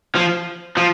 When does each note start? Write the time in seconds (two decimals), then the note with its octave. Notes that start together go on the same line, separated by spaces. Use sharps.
0.15 F3
0.77 F3